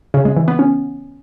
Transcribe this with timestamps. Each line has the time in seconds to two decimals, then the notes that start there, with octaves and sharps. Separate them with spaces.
0.14 C#3
0.25 G#3
0.37 E3
0.48 B3
0.59 C#4